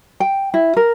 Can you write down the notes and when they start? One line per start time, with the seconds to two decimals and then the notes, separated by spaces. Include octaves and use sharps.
0.20 G5
0.54 E4
0.77 A#4